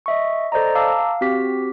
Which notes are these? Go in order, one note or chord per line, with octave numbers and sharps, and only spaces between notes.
D#5 E5 C#6
A4 C5 D5 D#5 A#5
F5 A5 A#5 D6 E6
F5
C4 F#4 G4 B6